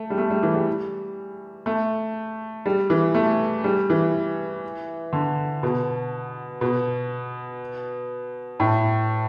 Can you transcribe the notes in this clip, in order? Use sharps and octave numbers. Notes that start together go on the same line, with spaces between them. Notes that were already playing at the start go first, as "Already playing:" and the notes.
Already playing: A3
G3
A3
G3
E3
G3
A3
G3
E3
A3
G3
E3
D3
B2
B2
A2